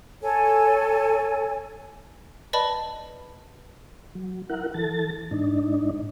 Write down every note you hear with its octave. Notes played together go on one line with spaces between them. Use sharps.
A4 C#5 G#5
B4 D5 D#5 A5 B5
F#3
E4 A#4 F#5
E3 A4 A6
G#2 D4 D#4